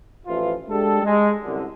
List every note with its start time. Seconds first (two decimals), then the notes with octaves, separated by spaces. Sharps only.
0.26 A1 E3 F3 F4
0.69 G#3 D4 G4 A4
1.03 G#3
1.42 C2 F#2 D3